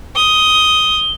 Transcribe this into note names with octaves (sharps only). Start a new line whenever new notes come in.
D#6 G7